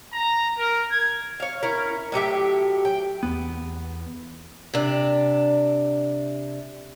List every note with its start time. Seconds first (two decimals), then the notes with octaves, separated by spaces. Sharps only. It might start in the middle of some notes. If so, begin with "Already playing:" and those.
0.13 A#5
0.59 A#4
0.91 G#6
1.40 C#5 F5
1.63 C#4 E4 A#4
2.12 A2 F#3 G4 E5
2.85 G5
3.23 E2 B3
4.74 C3 D4